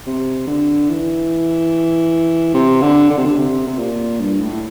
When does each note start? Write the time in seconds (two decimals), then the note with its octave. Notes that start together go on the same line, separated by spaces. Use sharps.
0.06 C3
0.47 D3
0.89 E3
2.54 C3
2.81 D3
3.10 D3
3.18 C3
3.25 D3
3.37 C3
3.67 C3
3.78 A#2
4.20 G2
4.41 A2